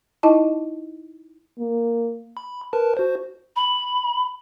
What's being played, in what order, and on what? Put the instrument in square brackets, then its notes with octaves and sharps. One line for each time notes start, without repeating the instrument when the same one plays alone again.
[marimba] D#4 E4 D#5 A5
[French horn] A#3
[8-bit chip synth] B5
A#4 B4 A5
F#4 C5
[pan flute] B5